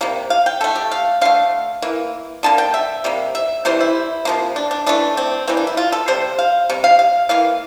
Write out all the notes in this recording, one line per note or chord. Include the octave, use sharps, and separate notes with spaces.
C3 G3 A#3
F5
G5
D3 A3 A4
G4
F5
D3 A3 F5
E3 A#3
D3 G3 A#3 A5
G5
E5
C3 G3 A#3
E5
C3 E3 G3 C5
E4
C3 F3 A#3
D4
D4
E3 A3 D4
C4
E3 G3 A#3 C4
D4
E4
F4
A4
C3 G3 C5
F5
C3 G3
F5
F5
E3 A#3 F5